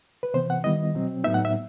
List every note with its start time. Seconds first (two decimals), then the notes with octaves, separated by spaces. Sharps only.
0.23 B4
0.34 C3 E3 B3 C5
0.50 F#5
0.64 D#3 G3 B3 E4 D#5
0.94 B2 F#3 C4
1.24 A2 F#3 B3 D#4 E5
1.34 F#5
1.45 E5